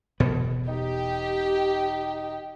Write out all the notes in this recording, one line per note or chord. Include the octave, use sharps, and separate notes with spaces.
E1 B2 B3
D#4 G4